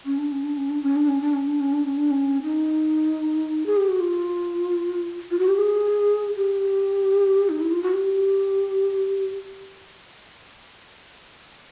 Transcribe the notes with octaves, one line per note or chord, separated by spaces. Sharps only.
C#4
D4
C#4
D4
C#4
D4
C#4
D4
C#4
D4
C#4
D4
C#4
D4
C#4
D4
C#4
D#4
G#4
G4
F#4
F4
F4
F#4
G4
G#4
G4
D#4
E4
F4
F#4
G4